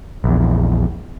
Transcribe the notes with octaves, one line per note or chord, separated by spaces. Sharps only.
A#1 E2